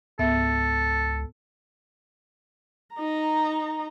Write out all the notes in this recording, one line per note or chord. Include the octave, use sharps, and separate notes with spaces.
C#2 G#2 B3 A4 E5
D#4 A#5